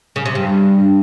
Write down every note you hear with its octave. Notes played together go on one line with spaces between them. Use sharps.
C#3
C3
G2